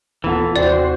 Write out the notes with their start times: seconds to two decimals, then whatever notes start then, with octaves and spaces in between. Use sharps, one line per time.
0.24 D#1 E3 A#3 B3 F4 A4
0.56 D#2 C3 C4 F#4 C5 D5